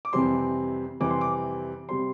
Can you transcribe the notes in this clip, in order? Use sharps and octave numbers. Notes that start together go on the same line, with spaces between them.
D6
F2 C3 E3 G3 C4 C6
F2 C3 E3 G3 C4 D6
C6
D6
C3 G3 C4 C6